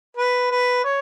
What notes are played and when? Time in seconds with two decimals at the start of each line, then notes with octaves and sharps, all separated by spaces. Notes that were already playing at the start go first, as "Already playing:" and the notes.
0.17 B4
0.51 B4
0.85 C#5